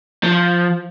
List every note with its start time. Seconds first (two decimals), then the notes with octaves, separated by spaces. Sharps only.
0.23 F3